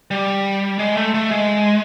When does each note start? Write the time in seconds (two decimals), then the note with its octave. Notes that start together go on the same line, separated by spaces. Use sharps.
0.11 G3
0.79 G#3
0.97 A3
1.14 A3
1.31 G#3